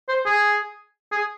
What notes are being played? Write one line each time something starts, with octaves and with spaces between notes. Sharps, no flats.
C5
G#4
G#4